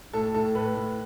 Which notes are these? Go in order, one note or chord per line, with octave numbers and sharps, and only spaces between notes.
A2 A4
A2 A4
A2 B4
A2